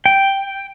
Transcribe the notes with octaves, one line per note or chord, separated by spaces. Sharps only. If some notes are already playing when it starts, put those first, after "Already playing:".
G5